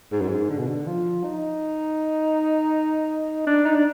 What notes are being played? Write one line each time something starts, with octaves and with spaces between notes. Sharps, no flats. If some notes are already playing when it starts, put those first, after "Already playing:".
G#2
F#2
G#2
D3
B2
D3
F3
D#4
D4
D#4
D4